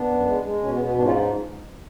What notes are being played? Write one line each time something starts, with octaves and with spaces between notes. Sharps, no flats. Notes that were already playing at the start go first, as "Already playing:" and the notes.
Already playing: B3 D4
F#2
G#3
G#3
B2 C#4
B3
B2
B3
G#2 B3 D4
C#4 F4